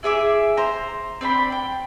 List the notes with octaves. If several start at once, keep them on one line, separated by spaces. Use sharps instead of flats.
E4 G#4 E5 D6
C5 A#5
C4 D4 G5 B5
G5